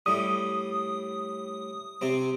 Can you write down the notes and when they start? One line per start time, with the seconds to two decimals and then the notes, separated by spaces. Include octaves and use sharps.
0.06 A2 G3 D#6
2.01 C3 C4